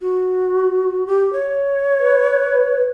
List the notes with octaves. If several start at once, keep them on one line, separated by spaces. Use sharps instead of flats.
F#4
G4
C#5
B4